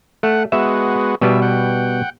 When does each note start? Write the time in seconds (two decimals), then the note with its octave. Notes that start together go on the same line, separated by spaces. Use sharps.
0.23 A3 F#5
0.52 G#3 B3 F#4 E5
1.21 B2 G3 B3 E5
1.42 F#5 G5